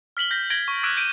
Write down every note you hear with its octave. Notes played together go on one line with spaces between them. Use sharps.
F6 B6 F#7 G7
G6 A#6 B6
G#6 A#6 D7 F#7 G7
C#6
D6 E6 F#6 G#6 B6 D7
G6 D7 D#7